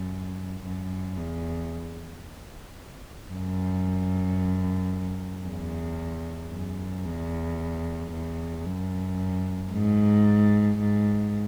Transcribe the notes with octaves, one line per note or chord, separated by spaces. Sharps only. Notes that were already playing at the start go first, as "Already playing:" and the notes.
Already playing: F#2
F#2
E2
F#2
E2
F#2
E2
E2
F#2
G#2
G#2